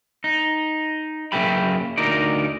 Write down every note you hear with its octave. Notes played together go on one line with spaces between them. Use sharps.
D#4
F#2 C#3 A#3 E5 G5 B5
D2 D#4 A#4 D5